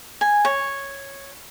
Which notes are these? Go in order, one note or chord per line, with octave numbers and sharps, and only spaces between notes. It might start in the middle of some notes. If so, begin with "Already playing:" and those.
G#5
C#5